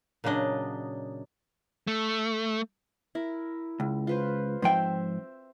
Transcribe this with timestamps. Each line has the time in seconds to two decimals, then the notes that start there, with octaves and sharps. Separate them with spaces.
0.24 A#2 C#3 F#3 D4 D#5
1.87 A3
3.15 E4 A#4
3.80 C#2
4.07 F4 B4 C5
4.62 G#2 F3 C4 C5 E5 G5